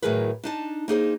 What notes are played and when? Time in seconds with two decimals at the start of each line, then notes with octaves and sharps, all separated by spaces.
0.02 A2 D#3 F#3 G#4 A#4 B4
0.44 D4 D#4 A5
0.88 A#3 D#4 G#4 C5